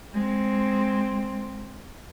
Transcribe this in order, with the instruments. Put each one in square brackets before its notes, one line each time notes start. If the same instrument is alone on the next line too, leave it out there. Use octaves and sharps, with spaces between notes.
[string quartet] G#3 C4